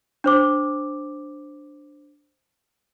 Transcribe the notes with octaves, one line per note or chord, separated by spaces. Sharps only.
D4 C5 D6